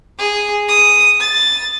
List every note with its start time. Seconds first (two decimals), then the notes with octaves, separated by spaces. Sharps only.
0.19 G#4
0.69 D#6
1.21 A6